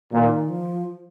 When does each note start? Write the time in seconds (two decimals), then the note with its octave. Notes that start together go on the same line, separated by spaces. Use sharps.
0.12 A#2 D#3
0.50 F3